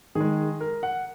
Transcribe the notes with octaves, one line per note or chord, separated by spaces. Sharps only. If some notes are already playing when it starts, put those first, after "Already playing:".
D#3 G#4
G#3
A#4
F#5